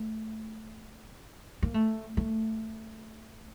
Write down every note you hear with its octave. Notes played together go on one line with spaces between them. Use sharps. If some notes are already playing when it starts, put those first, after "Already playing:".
Already playing: A3
A#3
A3
A3